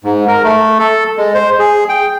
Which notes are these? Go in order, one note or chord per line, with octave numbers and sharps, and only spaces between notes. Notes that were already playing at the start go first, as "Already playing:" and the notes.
G#2
A#4
A3
A4
G#3
C5
G#4
G5